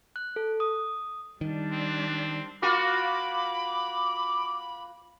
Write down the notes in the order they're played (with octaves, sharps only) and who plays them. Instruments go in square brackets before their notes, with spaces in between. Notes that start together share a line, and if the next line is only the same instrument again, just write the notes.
[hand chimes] F#6
A4
D#6
[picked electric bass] D#3 [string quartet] G3 D4
[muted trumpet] C4
[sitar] A#3 F4 F#4 [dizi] B5 [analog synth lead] D6